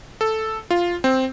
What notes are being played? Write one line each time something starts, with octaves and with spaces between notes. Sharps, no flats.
A4
F4
C4